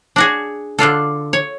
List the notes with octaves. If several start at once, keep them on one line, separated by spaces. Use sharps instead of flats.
D4 F#4 G#4
D3 D4 F4 A4
C#5